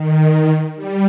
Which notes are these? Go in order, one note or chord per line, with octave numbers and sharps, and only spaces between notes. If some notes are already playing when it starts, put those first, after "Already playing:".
Already playing: D#3
G3